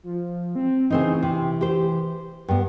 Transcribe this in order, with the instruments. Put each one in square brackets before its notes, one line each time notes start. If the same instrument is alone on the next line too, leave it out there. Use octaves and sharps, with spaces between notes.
[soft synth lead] F3
C4
[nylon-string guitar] C#3 C4 D#4 [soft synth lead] E3
[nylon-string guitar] C3
G4 C5
G2 B3